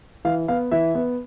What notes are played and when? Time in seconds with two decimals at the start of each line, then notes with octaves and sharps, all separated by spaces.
0.25 E3 F5
0.48 B3 F5
0.72 E3 E5
0.95 B3